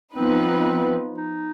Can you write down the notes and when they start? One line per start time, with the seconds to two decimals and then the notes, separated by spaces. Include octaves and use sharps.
0.15 F3 B3 C4 D#4 B4
1.17 D#4